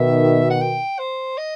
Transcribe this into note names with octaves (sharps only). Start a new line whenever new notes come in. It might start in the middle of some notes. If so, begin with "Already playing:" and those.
Already playing: B2 D#3 E5
F#5
G5
C5
D#5